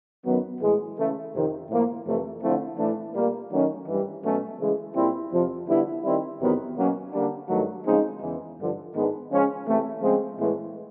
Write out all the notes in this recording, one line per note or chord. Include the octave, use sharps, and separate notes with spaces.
F#2 D#3 F#3 B3
A2 E3 G#3
C#3 E3 A3
F2 C3 D#3
A2 F3 A#3
F2 C3 E3 A3
D3 F3 A3 C4 E4
A2 E3 A3 D4
A#2 G3 A#3
D#3 F#3 A3 C#4
G2 E3 G3
B2 F#3 A3 C#4
C#3 E3 G#3
A#2 G3 C4 E4
F2 C3 F3
D3 G3 B3 E4
D#3 G3 C4 E4
E2 C3 D#3 F#3 B3
B2 F#3 A#3 C#4
D3 G3 A#3 D4
G2 D#3 F#3 A3
C#3 F3 G#3 C4 D#4
E2 C#3 E3
G2 D3 F3
G#2 D#3 G#3 B3 D4
C#3 F3 G#3 C#4
C3 E3 A3 C4 E4
C#3 F3 G#3 C4
A2 E3 G#3 B3